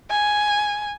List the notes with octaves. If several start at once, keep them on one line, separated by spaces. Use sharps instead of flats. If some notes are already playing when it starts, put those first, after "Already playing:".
G#5